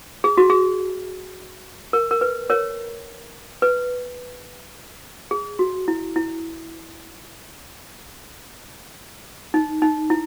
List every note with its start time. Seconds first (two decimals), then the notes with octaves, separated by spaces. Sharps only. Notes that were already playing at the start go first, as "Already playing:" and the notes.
0.24 G#4
0.37 F#4
0.50 G#4
1.93 A#4
2.11 A#4
2.21 B4
2.50 A#4 C#5
3.62 B4
5.31 G#4
5.59 F#4
5.88 E4
6.16 E4
9.54 D#4
9.82 D#4
10.10 E4